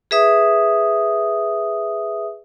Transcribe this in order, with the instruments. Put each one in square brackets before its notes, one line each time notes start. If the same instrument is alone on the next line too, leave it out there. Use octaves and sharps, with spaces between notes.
[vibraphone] G#4 B4 E5 D#6